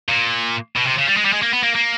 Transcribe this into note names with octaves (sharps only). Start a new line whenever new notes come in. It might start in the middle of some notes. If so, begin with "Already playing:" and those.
A#2
B2
C3
C#3
G3
G#3
G3
G#3
A#3
B3
A#3
A#3